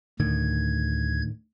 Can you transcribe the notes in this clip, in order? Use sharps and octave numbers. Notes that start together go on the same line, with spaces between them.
D2 A2 D3 D#3 G#6